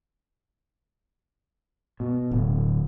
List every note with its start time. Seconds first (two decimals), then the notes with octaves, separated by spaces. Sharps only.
2.00 B2
2.31 D1